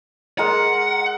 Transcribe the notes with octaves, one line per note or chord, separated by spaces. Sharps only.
G#3 A#4 F#5 A#5